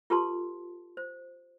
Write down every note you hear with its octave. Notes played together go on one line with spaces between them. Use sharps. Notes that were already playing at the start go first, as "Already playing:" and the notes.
F4 G4 A4 B4 A5 C6
C5